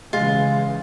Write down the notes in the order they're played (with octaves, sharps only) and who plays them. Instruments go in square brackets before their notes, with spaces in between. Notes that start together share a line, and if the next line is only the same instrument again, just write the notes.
[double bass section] C#3 E3 [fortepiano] G#3 [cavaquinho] F4